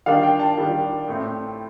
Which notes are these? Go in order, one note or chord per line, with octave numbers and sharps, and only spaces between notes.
D#3 G3 D4 F5
G5
A5
D#3 G3 D4
A2 A3 C4